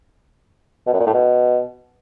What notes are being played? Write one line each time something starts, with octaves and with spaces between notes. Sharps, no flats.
B2
F#2
A#2
A2
B2